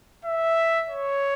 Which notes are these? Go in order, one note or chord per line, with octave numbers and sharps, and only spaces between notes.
E5
C#5